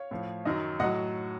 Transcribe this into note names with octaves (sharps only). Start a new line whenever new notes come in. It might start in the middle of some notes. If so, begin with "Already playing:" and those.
Already playing: C#5 F5
A2 F3
F#2 D#3 F#3 D#5
A2 F#3 D#5 F#5